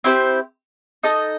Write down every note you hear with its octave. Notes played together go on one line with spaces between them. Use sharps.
C4 E4 G4 C5
D#4 A4 D#5